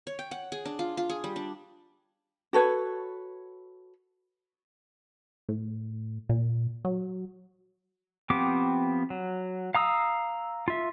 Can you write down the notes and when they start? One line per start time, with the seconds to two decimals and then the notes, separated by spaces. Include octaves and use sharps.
0.07 C#5
0.19 G5
0.31 F#5
0.52 G#4
0.65 D4
0.79 F4
0.97 F4
1.10 G#4
1.24 G3
1.36 D4
2.53 F#4 A4 B4 C#5
5.49 A2
6.29 A#2
6.85 F#3
8.30 F3 B3 C4 G4 D6
9.10 F#3
9.75 F5 A#5 D#6 E6
10.68 F4 E5